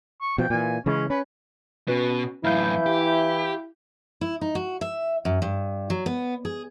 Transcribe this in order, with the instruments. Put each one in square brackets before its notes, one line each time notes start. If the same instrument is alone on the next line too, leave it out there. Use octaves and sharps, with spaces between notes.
[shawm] C#6
[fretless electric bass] B2 F3 [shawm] G5
[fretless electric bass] A#2 E3 [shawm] G#5
[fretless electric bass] C#3 E3 G#3 [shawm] C#4
[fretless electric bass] C#4 [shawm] B4
[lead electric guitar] B2 [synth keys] C#4 F#4 B4
[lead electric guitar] F#2 A2 [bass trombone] E3 [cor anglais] E4 [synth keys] F5 G6
[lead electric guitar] G4
[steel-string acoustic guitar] E4
D#4
F#4
E5
F#2
G2
F#3
B3
G#4